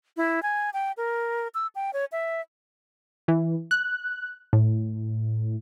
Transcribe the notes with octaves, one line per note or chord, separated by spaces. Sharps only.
E4
G#5
G5
A#4
E6
G5
C#5
E5
E3
F#6
A2